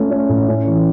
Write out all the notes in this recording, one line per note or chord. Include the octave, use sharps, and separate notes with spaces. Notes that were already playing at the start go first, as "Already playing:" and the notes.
Already playing: A3 C#4
C#4
A2
C#4
E3